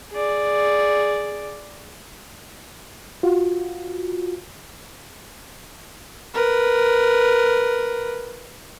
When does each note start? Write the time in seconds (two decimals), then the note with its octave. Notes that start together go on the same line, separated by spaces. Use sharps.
0.11 G#4 D5
3.23 F4 F#4
6.34 A#4 B4